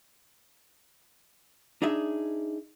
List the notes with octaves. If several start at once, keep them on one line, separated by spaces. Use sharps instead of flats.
D4 D#4 G#4 E5